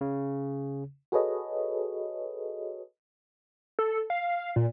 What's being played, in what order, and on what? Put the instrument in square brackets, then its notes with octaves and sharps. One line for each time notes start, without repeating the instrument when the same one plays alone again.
[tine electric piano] C#3
[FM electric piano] F#4 G#4 A4 B4 C#5 D#5
[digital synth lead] A4
F5
A#2